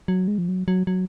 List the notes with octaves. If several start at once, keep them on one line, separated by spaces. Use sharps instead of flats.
F#3
G#3
F3
F#3
F#3
F#3